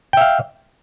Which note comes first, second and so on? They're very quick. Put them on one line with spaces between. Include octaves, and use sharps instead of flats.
G5 E5 F5